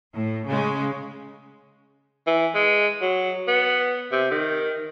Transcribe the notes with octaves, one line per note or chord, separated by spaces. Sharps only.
A2
C#3 G#3
E3
G#3
F#3
B3
C3
D#3